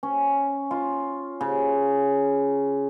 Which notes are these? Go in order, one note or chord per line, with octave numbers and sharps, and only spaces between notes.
C#4
F4
C#3